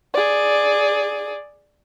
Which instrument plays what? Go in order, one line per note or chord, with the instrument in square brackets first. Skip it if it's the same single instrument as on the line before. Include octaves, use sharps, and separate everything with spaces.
[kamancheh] G#4 D5